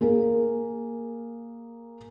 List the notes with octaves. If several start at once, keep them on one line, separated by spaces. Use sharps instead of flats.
A#3 G#4 A#4